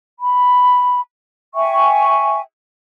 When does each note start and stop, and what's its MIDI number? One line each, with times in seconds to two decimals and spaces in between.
0.20 1.01 83
1.55 2.40 76
1.55 2.40 79
1.55 2.40 80
1.55 2.40 85